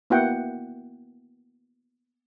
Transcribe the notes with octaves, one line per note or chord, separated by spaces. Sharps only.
A#3 B3 E4 F#4 F#5 G5